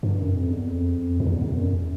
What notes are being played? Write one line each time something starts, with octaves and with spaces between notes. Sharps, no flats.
G2
F#2
F2
E2
F2
F2
E2
E2
F#2